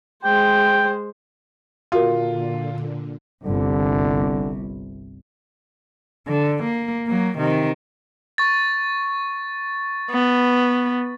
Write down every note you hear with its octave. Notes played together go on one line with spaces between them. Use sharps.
G#3 C5 G5
A#2 D3 F4 F#4 A#4
G1 C2 D3
D3
A#3
F#3 A#3
C3 D#3
C#6 A6
B3